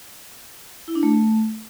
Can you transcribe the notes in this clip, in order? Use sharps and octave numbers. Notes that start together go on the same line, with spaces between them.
E4
D4
A3